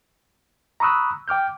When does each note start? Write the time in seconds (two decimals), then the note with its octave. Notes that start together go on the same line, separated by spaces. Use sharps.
0.80 A#5 B5 C#6 D#6 E6 F#6
1.28 G5 D6 F6 G6